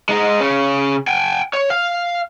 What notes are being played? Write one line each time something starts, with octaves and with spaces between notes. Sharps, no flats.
G#3 D#4
C#3 C#4
G5 G#5
C#5
F5